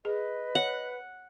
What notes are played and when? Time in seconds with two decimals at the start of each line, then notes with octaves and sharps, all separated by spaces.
0.05 G#4 B4 D#5
0.55 C#5 F#5